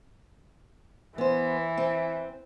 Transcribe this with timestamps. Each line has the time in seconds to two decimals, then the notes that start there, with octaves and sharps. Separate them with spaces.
1.18 E3 B3 C5
1.77 C4